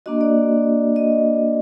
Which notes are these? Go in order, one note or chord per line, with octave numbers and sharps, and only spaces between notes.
A#3 D4 F#4 D#5
D5
D#5